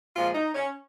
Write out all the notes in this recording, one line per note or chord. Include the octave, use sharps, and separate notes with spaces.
A#2 F3 G#3 F4
D#4
C#4